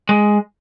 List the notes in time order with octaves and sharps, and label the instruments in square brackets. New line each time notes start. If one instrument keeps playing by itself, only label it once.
[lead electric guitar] G#3